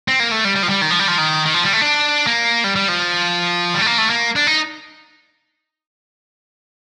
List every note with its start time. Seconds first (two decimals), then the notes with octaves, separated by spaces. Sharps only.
0.08 C4
0.20 A#3
0.31 A3
0.45 G3
0.56 G3
0.63 F3
0.69 G3
0.81 D#3
0.91 F3
0.99 G3
1.08 F3
1.18 D#3
1.46 D#3
1.54 F3
1.64 G3
1.73 A3
1.81 D4
2.27 A#3
2.64 G3
2.76 G3
2.88 F3
3.74 G3
3.81 A3
3.86 A#3
3.98 A3
4.10 A#3
4.36 D4
4.47 D#4